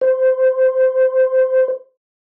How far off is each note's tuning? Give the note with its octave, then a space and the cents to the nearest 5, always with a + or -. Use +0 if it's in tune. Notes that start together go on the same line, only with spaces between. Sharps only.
C5 -15